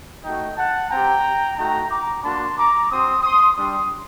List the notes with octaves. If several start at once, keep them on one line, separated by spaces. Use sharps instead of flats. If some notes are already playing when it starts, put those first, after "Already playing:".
A3 D#4 F#4 D#5 G5
F#5 A5
C4 G4 G5 A#5
A3 D#4 F#4 G5 A#5
A#5 D6
A#3 D4 F#4 A5 C6
A#5 D6
C4 F#4 C6 D#6
C6 D#6
G3 D4 G4 C6 D#6